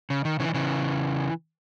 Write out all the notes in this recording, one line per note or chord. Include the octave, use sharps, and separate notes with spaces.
C#3
D#3
C#3 E3
D#3
C#3 E3